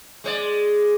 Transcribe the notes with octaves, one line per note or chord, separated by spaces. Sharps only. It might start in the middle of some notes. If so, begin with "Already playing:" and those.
G#3 C5 D5